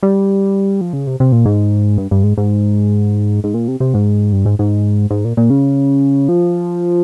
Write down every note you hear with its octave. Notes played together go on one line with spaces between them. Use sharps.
G3
F3
C#3
C3
C3
A#2
G#2
G2
G2
G#2
G#2
G#2
A#2
C3
C3
G#2
G2
G#2
G#2
G#2
A#2
A#2
C#3
F3